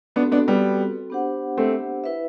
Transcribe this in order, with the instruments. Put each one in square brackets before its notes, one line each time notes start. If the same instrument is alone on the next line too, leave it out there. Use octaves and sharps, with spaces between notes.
[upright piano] B3 D4 [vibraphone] C4 F#4 A4
[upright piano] B3 D4
G3 B3
[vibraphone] B3 D4 G4 C5 F#5
[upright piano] A3 C4
[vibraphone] E4 B4 E5